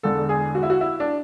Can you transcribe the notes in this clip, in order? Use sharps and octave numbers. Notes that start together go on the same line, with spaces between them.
E1 E2 D3 A4
G#4
F#4
E4
F#4
E4
D4